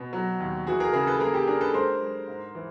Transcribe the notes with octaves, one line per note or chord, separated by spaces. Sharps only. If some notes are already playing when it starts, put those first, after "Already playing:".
Already playing: B2
F#3
D#2
E3 F#4 G#4
G#4 A#4
C#3 G#4 A#4
A4 B4
A#3 G#4 A#4
G4 A4
D4 G#4 A#4
A4 B4
G#3 A#4 C5
G#3
G#2
E3